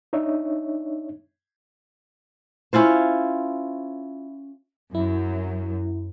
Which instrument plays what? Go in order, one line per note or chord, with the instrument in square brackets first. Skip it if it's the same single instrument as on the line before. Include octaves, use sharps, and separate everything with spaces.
[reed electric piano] D4 D#4 C#5 E5
[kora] C#4 E4 F4 C5
[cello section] F#2 [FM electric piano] E4